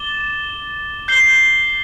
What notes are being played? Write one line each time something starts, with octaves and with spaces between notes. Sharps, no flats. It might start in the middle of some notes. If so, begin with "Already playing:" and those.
Already playing: D6 A6 E7 G7
G6 C7 G7